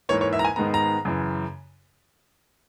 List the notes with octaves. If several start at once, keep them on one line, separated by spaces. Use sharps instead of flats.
G#2 E3 A#3 C#5
C#5
E5
A#5
G#5
G#2 D#3 G#3 B3 A#5
A#5
F#2 C#3 E3